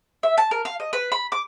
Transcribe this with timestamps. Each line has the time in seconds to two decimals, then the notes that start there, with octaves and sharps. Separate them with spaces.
0.23 E5
0.38 A5
0.51 A#4
0.65 F5
0.80 D#5
0.93 B4
1.12 B5
1.32 D6